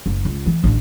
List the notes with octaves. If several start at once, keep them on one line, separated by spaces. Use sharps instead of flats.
F#1
C#2
E3
A1 D3